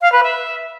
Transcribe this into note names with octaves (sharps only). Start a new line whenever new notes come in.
F5
B4
E5